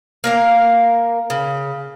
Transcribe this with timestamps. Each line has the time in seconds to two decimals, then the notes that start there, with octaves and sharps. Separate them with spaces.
0.24 A#3 A#4 F5
1.30 C#3